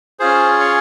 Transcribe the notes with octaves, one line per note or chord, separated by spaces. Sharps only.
C#4 F4 G#4 C5
C#5